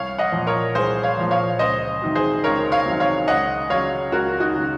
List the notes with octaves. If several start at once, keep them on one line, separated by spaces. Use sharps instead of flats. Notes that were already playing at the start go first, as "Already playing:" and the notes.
Already playing: C2 C#5 F5
D#5 F#5
A#2 F3
A#4 C#5
C2 G#4 C5
C#5 F5
A#2 F3
C#5 F5
C#2 C5 D#5
C3 D#3 F#3
G#4 C5
C#2 A#4 C#5
C#5 F5
C3 D#3 F#3
C#5 F5
C#2 D#5 F#5
C#3 F#3 C#5 F5
C#2 F#4 A#4
D#4 F#4
C#3 F#3